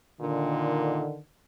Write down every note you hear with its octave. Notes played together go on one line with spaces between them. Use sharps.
A#2 D3 D#3